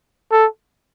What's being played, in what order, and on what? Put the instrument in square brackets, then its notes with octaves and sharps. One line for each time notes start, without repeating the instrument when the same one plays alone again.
[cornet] A4